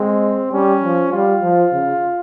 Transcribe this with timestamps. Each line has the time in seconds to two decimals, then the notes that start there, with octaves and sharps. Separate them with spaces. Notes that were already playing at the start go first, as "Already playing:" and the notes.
Already playing: G#3 C4
0.52 G3 C#4
0.83 F3
1.12 G3 F4
1.42 F3
1.72 C#3